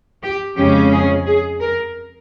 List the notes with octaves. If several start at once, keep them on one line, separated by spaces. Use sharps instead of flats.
G4
F2 C#3 G#3 C#4 G4
G#4
G#4
A#4